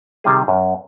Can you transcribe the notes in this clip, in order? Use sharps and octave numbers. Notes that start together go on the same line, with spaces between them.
C3 D#3 G3 G#4
F#2